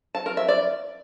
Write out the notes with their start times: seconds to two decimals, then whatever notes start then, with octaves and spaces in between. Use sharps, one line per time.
0.15 A5
0.26 A#4
0.37 E5
0.48 D5